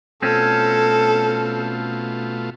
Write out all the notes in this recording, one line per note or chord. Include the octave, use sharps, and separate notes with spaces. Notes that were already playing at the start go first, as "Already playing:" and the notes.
B2 A3 C4 C#4 F4 A4